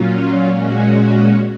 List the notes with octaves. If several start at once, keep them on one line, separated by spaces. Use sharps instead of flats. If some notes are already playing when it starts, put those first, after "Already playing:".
Already playing: A#2 F#3 C#4 F4
A#2 G#3 C#4 F#4